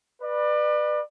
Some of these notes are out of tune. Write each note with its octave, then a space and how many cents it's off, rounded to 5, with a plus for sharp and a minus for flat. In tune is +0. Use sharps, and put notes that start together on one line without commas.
B4 -10 D5 +30